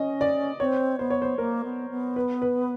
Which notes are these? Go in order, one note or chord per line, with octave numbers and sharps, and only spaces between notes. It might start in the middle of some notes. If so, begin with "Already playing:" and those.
Already playing: C#4 D#5
D5
C4 C#5
B3 C5
C#5
C5
A#3 A#4
B3
B3
B4
B4